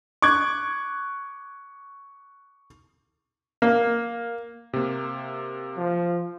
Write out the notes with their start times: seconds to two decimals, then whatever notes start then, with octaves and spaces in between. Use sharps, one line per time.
0.22 C#6 D6 F#6 G#6
3.62 A#3
4.73 C3 A#3
5.77 F3